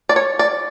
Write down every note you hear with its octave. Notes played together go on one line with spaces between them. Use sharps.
D5
C#5
D5